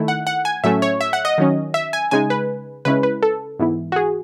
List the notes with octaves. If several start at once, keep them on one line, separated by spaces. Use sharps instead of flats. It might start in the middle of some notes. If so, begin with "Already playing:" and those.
Already playing: D#3 A3 E4
F#5
F#5
G#5
A2 F#3 A3 C#4 E5
C#5
E5
F#5
D#5
D#3 F#3 C#4
E5
G#5
C#3 G#3 D#4 G#5
B4
C#3 G#3 C#4 E4 B4
B4
A4
G#2 E3 B3 E4
F#4
G#4